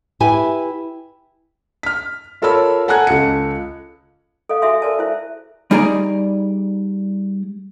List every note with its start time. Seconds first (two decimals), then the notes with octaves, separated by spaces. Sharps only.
0.20 E4 G4 B4 G#5
1.83 F6 B6
2.42 F4 A4 A#4 C#5 B5 E6
2.88 A4 F#5 G#5 A#5 F#6 G#6
3.07 C#2 A4 C#7
4.49 A4 D#5 F5
4.62 F#4 G#4 A4 E5 G#5 C6
4.82 A4 A#4 D5 G#5 A5
4.99 E4 C5 E5
5.71 G3 D#4 G#4 D5 A#5